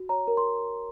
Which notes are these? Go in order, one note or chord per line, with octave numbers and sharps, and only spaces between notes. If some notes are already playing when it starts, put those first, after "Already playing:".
Already playing: F#4
C#5 A#5
A#4
C6